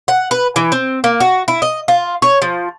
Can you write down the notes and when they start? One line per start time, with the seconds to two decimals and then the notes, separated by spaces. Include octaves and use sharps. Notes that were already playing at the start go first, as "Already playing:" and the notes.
0.08 F#5
0.31 B4
0.56 E3
0.72 C4
1.04 A#3
1.20 F#4
1.48 E4
1.62 D#5
1.88 F4
2.22 C#5
2.42 F3